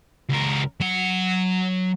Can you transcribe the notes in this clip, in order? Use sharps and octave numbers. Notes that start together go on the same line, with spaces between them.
C#2 A#4
F#3 F#5